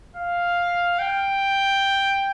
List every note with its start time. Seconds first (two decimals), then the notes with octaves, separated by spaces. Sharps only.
0.17 F5
0.99 G5